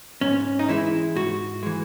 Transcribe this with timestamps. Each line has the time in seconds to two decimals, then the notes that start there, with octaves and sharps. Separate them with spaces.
0.21 G#2 C#4
0.59 D#4
0.69 E3 G#3 E4
1.15 G#2 F#4
1.63 E3 G#3